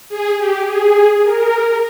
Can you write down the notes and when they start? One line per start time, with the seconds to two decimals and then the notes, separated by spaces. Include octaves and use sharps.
0.09 G#4
0.37 G4
0.66 G#4
1.23 A#4